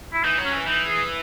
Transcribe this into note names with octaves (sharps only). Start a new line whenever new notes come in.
E4
E3 D#4
F#3
C#4
E3
E3 D#4
G#4